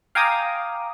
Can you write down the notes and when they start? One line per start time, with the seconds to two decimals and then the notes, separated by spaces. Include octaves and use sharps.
0.15 F5 G5 G#5 A#5 D6 D#6